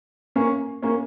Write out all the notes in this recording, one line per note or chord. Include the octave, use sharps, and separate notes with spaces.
A#3 C#4
A#3 C#4